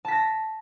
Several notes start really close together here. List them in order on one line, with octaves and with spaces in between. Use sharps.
A5 B6 A#6